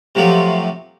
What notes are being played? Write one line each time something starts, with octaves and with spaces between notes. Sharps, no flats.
C3 F3 F#3 A3